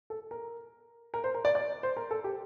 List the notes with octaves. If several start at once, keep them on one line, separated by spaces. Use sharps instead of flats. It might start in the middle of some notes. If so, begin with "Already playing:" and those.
A4
A#4
A#4
C5
A#4
D5
D5
C5
A#4
A4
G4